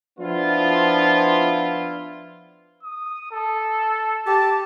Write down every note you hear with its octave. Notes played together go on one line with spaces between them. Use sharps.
F3 B3 D4 E4 F4
D#6
A4
G4 A5